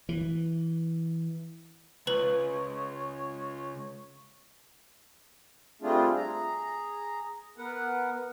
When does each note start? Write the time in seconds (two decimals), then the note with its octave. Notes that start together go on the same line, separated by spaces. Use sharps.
0.09 E3
2.07 C#2 B4 C#5 F#7
5.82 G3 A3 C4 D4 F4 G#4
6.16 G#4 A#5
7.58 B3 A#4 B4 F#5